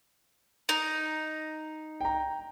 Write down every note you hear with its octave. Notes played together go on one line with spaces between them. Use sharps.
D#4
G5 A#5